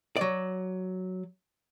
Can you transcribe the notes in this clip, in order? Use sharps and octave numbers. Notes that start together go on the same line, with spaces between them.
F#3 D5